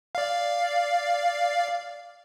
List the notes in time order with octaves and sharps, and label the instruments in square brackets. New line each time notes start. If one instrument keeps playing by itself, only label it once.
[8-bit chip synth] D5 F5